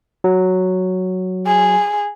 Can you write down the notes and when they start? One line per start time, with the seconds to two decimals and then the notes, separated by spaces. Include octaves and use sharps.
0.24 F#3
1.46 G#4